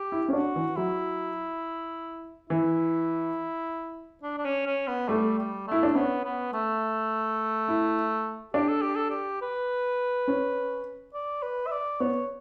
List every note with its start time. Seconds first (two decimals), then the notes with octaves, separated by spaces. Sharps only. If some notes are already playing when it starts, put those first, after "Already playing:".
Already playing: G4
0.12 E4
0.28 C#4
0.33 D4 F#4
0.56 E3
0.76 F#3 E4
2.50 E3 E4
4.23 D4
4.38 D4
4.45 C#4
4.66 C#4
4.87 B3
5.09 G3 A3
5.38 G3
5.67 A3 E4
5.83 D4
5.95 B3 C#4
6.24 B3
6.53 A3
7.68 E4
8.54 D4 G4
8.68 A4
8.82 G4
8.96 A4
9.10 G4
9.41 B4
10.28 C#4
11.14 D5
11.43 B4
11.67 E5
11.72 D5
12.00 B3 C#5